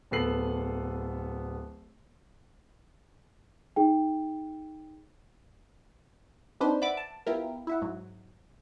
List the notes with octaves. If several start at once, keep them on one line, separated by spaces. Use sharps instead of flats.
D1 B3 A4 C7 F#7
D#4 G#4 G5
C4 D4 D#4 B4 C5
D5 E5 F#5 B5 D6
A5
B3 E4 F4 G4 A#4
E4 E5 F#5
G#2 F#3